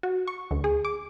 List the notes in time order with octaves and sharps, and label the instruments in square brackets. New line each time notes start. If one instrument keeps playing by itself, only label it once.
[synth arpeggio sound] F#4
C#6
D2
G#4
D6